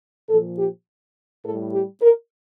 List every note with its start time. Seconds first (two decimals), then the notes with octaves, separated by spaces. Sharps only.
0.29 A#2 F3 A4
0.59 G4
1.44 A2 A4
1.49 G3
1.74 G4
2.02 A#4